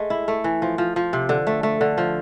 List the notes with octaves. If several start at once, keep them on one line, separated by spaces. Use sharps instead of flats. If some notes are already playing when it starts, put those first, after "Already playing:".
Already playing: G#3 A3
E4
A3
E3
F3
F3
F3
C3
D3
A3
A3
D3
F3